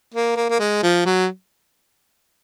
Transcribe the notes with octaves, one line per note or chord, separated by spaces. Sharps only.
A#3
A#3
A#3
G#3
F3
F#3